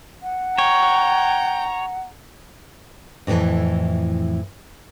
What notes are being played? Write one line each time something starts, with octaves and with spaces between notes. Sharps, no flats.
F#5
C#5 G5 A#5
F2 A2 D#3 E3